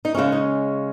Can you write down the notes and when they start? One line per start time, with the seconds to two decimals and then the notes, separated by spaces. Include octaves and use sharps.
0.05 D#4
0.14 C#3 G#3 C#4 E4
0.32 D#4